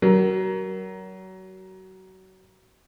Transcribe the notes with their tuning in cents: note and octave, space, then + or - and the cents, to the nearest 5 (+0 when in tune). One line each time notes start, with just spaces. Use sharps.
F#3 +30 A#4 +10